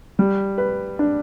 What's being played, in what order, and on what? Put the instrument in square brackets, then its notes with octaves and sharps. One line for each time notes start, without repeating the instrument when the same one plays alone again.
[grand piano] G3
B4
D4